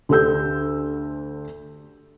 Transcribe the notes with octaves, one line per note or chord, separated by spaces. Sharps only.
D2 D3 G4 A4 E6 G6